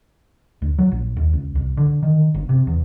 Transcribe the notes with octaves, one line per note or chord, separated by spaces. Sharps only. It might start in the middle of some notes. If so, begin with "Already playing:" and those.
D2
F#3
A#1
D#2
C#2
C2
D3
D#3
G1
C3
E2